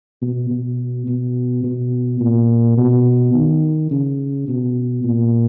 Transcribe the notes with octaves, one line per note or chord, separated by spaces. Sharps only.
B2
B2
B2
B2
A#2
B2
D#3
C#3
B2
A#2